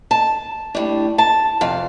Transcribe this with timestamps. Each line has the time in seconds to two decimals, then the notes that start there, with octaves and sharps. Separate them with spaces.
0.11 A5
0.75 A2 G3 D4
1.18 A5
1.61 F2 C3 F5